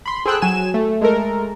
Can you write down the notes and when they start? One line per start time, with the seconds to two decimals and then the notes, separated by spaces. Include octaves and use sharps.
0.06 B5 C6
0.26 G#4 A4 C5 G5 E6 F#6
0.42 F#3 G#5 E7
0.74 A3
1.01 G#3 A3 A4 A#4